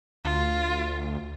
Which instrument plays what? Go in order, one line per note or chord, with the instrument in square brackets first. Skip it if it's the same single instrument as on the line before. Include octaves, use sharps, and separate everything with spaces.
[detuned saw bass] D2 [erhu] F4